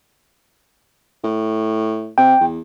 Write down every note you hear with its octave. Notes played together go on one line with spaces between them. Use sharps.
A2
C3 G5
E2